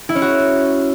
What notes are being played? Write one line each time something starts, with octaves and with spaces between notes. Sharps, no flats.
E4
C#4
F#4